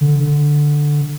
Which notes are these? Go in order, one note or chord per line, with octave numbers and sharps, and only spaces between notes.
D3
D3